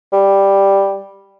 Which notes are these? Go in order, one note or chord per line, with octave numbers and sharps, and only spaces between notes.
G3